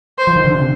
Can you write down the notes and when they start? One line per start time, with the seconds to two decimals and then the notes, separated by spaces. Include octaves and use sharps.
0.18 C5
0.27 F3
0.36 D#3
0.45 D3
0.54 C3